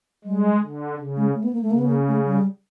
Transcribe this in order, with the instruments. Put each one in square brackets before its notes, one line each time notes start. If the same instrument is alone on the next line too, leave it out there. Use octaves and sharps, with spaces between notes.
[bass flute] G3 [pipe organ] G#3
[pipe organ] D3
C#3
[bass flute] G#3
A3
B3
A#3
A3
[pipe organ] C#3 [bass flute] A#3
[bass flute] B3
A#3
A3
G3